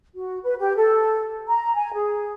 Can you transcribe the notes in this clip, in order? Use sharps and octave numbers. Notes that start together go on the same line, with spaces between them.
F#4
B4
G4
A4
A#5
G#5
G#4